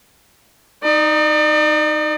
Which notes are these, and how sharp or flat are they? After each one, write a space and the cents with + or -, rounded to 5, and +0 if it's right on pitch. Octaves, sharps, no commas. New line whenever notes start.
D#4 +0 D5 +40